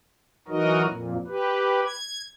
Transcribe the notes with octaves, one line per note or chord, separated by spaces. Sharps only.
E3 F#3 D#4 F#4 A#4 D#5
F2 A#2
G4 B4
G#6